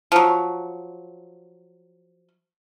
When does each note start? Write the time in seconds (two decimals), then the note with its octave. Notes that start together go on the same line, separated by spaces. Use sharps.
0.12 F3 F#3